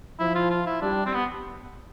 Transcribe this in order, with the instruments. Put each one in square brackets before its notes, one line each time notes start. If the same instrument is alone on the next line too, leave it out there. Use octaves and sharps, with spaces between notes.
[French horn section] F3 [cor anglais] E4
[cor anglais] F4
F4
E4
[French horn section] G3 [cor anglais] D4
[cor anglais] C4
B3